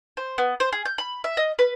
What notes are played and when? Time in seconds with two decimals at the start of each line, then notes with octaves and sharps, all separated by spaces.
0.17 C5
0.38 B3
0.60 C5
0.73 G#4
0.85 G6
0.98 B5
1.24 E5
1.37 D#5
1.59 B4